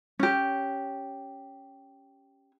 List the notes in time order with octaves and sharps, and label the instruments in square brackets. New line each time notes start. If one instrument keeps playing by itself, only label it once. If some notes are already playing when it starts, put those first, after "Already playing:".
[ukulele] C#4 G4